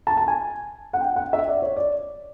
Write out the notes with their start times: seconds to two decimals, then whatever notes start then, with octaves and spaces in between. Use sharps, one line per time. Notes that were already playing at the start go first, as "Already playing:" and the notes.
0.07 A5
0.17 A5
0.28 G#5
0.93 F#5
1.01 G5
1.16 F#5
1.33 E5
1.47 D5
1.62 C#5
1.76 D5